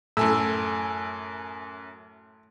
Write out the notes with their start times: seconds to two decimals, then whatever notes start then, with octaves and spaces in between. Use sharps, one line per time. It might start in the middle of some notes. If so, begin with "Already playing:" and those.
0.17 F#2 A2 G#5 E6